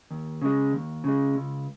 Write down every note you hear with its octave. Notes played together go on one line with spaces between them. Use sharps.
D#2
C#3 G#3
D#2
C#3 G#3
C#2